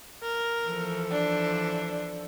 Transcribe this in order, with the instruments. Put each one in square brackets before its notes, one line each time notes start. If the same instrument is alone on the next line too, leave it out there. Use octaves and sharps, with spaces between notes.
[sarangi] A#4
[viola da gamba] E3 F3 A4
[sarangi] D4